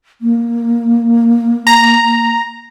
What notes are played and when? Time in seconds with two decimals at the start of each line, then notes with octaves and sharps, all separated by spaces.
0.21 A#3
1.67 A#5